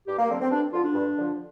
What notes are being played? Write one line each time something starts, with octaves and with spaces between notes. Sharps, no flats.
G2 G4
A#3
D3 F3 C4
C4
G2 D4
D3 F3 F4
D4
G2
D3 F3